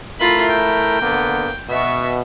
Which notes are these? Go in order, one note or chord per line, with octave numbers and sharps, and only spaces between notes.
A3 E4 F4 A#4 B5
G5
D3 A#3 B3
B2 E5 C#6